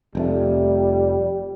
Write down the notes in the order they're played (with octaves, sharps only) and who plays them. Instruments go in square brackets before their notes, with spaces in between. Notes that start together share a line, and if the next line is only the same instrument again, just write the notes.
[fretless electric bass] F1 F2 A3 [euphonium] G3